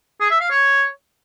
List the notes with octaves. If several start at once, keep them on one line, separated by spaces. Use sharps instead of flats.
G#4
E5
F5
C#5